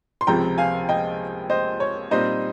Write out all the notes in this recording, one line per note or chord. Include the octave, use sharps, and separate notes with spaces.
C6
C#2 C3 F3 G#3 C4 G5 A#5
F5 G#5
D#5 G5
C5 D#5
C#5
A#2 G3 C4 D#4 C5 D#5